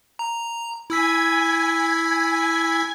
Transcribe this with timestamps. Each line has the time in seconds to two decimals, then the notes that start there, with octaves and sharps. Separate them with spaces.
0.19 A#5
0.90 E4 G#5 E6 G#6 B6